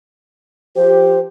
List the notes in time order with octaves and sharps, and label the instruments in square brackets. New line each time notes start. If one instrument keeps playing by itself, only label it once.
[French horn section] F3 G4 [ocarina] C5